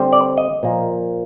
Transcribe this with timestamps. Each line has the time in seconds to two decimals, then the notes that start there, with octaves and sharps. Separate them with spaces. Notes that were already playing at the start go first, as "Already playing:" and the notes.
Already playing: D3 G3 C4
0.13 D5
0.38 D#5
0.63 A#2 F3 A#3